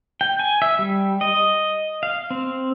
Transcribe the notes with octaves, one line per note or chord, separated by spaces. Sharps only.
G5
G#5
E5
G3
D#5
F5
C4